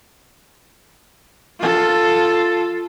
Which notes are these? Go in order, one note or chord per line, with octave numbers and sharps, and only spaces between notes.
F4 A4